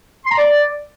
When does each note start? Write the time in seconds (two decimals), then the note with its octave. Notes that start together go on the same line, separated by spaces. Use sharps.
0.25 C6
0.31 A#5
0.38 D5